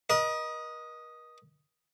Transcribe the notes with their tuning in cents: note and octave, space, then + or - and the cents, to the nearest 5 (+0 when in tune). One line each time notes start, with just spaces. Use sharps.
A#4 +45 D#5 +0